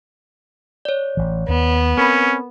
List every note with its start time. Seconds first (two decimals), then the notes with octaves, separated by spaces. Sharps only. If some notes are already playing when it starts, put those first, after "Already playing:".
0.85 C#5 D5
1.17 A1 E3
1.48 D#2 B3
1.98 C4 C#4 A#4 B5